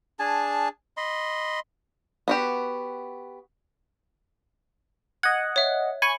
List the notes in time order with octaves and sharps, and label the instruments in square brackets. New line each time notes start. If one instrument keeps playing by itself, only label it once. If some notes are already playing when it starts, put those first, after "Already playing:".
[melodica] D4 G#4 G#5 A5
D#5 B5 C6
[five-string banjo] B3 F#4 G4
[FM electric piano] D#5 F#5 [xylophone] G#6
[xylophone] C#5 E5
[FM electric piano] G#5 C#6 [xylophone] B5